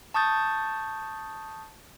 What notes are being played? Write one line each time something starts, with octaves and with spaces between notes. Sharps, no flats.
A5 C#6 D#6 G6 A6